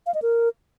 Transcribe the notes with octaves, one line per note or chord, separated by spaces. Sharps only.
F5
D#5
A#4